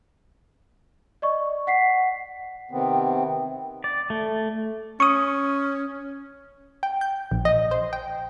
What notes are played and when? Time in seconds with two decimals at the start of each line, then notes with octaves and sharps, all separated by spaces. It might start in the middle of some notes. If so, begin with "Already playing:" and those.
1.22 D5 D#5 C#6
1.67 F#5 B6 C7
2.71 C3 D#3 B3 C4
3.84 D5
4.10 A3
5.00 C#4 C#6 D#6
6.83 G5
7.01 G6
7.31 A#1
7.45 D#5
7.71 C5
7.93 G5